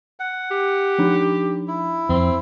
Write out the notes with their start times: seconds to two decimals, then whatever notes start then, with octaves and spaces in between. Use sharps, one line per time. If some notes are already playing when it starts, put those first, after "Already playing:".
0.20 F#5
0.51 G4
0.99 F3 D4 D#4
1.68 E4
2.09 F2 C4